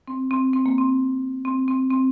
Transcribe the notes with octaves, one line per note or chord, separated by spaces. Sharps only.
C4
C4
C4
A#3
C4
C4
C4
C4